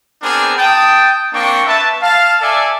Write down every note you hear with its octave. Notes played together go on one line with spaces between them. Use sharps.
B3 C4 D4 G#4 A#4 C5
G5 A5 D#6
A#3 C4 D4 G5 C#6
B4 E5 A5
F5 A5
A4 D5 E5 G#5 A5